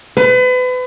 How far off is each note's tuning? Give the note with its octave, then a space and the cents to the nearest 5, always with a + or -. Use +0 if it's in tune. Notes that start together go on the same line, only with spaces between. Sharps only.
B4 +35